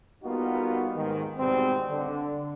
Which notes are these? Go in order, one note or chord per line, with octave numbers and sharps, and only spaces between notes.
G3 A#3 B3 D#4 F4 F#4
G#2 D#3
G#2 B2 G3 C4
D3